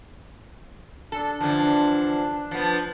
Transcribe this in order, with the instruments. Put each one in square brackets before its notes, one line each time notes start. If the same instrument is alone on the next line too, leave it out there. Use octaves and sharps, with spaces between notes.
[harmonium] D4 [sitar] A4
[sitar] D3 E3 F3
F3 B3